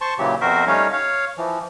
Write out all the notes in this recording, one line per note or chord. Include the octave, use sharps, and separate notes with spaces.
C5 A5 C6 C#6
A#2 C#3 E3 F#3 G4
F2 B2 F#4 A#4 C5 E5
G3 A3 C#4 D#4 C#5 F5
C#5 F5
E3 F3